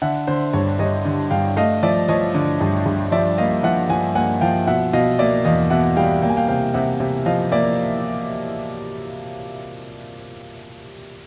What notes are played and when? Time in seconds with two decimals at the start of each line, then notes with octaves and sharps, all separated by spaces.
0.02 D3 E5 F#5
0.27 D3 C5
0.53 G2 C#5
0.79 G2 C#5 D#5
1.05 D3
1.30 G2 F5 G5
1.57 A3 D#5 F5
1.83 F3 D5 E5
2.08 F3 C#5 D#5
2.35 D3
2.61 G2
2.86 G2
3.12 F3 D5 E5
3.38 A#3 D#5 F5
3.63 F3 E5 F#5
3.89 F3 F#5 G#5
4.15 A#3 F#5 G#5
4.41 F3 F5 G5
4.67 B2 E5 F#5
4.93 B2 D#5 F5
5.19 A#3 D5 E5
5.45 E2 D#5 F5
5.70 B2 E5 F#5
5.96 G3 F5 G5
6.22 A#3 G5
6.29 G#5
6.37 F5 G5
6.48 C3 F5 G5
6.74 C3 E5 F#5
7.00 C3
7.26 F3 D#5 F5
7.52 A#3 D5 E5